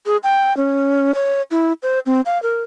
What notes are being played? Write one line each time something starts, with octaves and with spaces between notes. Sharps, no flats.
G#4
G5
C#4
C#5
E4
C5
C4
F5
A#4